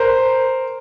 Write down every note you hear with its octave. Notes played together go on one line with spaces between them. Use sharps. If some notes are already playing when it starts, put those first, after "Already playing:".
Already playing: A#4 C5